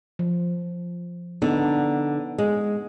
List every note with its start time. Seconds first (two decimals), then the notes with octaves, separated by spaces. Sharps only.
0.19 F3
1.42 D3 B3 D4 D#4
2.38 G#3